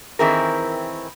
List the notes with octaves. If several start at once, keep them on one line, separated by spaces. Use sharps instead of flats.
D#3 E3 C4 E4 G#4 A#4